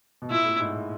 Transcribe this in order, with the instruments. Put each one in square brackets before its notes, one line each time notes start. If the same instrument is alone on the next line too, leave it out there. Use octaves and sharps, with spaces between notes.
[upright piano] B2
[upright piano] A#2 [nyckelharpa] E4
[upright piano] A2
G#2